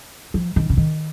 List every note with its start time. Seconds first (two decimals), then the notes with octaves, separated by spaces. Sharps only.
0.34 F3
0.56 D#3
0.70 C#3
0.77 D#3